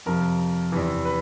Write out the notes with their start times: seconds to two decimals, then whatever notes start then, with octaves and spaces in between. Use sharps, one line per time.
0.06 F2 C3 F3 A#4
0.72 E2 C3 E3
1.05 B4